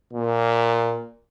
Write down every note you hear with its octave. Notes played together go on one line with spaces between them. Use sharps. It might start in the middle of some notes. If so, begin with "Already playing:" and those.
A#2